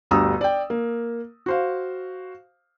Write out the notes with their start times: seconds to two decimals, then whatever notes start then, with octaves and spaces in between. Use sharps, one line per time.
0.11 G1 D2 G3 A#5 D#6 E6
0.41 D5 G5
0.70 A#3
1.46 F#4 C5 F5